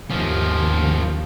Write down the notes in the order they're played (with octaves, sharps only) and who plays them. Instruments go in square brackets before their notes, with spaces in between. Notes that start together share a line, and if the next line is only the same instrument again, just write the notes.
[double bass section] D#2 [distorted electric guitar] F3 C#4